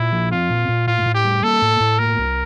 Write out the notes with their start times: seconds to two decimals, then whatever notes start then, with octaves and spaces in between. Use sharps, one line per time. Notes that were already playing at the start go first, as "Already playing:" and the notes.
Already playing: A#2 E4
0.12 F3
0.31 C4 F4
0.50 A#2
0.68 A#2
0.87 A2 F4
1.06 A2
1.15 G4
1.24 G3
1.43 A#3 A4
1.62 A2
1.80 A2
1.99 A#3 A#4
2.18 C2